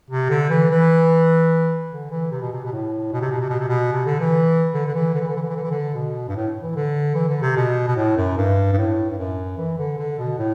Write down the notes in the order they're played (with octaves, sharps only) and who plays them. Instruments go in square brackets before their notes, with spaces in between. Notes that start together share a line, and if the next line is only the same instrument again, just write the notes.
[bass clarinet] C3
D3
E3
E3
D3
E3
C3
B2
C3
B2
A2
B2
C3
B2
C3
B2
C3
B2
C3
D3
E3
D3
D3
E3
D3
E3
D3
E3
D3
E3
D3
E3
D3
B2
G2
A2
E3
D3
E3
D3
C3
B2
B2
A2
F#2
G2
G2
A2
G2
F#2
E3
D3
D3
B2
A2